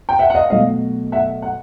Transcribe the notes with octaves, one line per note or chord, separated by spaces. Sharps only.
G5
E5 F#5
F#5
D#5 F5
B2 F#3 A3 D#5 F5
E5 F#5
F#5